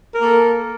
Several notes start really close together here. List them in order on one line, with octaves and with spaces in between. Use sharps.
A#4 A#3 A4